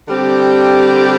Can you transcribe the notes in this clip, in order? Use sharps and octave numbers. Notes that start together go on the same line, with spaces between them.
D3 G3 C4 G4